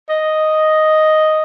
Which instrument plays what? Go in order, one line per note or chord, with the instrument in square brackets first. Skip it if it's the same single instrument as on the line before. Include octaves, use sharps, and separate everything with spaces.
[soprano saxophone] D#5